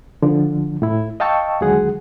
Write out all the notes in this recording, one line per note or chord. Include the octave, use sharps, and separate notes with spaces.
D3 F3
A2 E4
D#5 F5 G5 A5 C#6 E6
D#2 D3 F#3 G#3 G#4 F#5